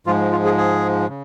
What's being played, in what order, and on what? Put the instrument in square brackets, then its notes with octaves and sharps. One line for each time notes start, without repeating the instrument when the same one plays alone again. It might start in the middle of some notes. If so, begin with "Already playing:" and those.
[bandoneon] G#2 F3 G#3 F4
F4
G#4
G#4
C#3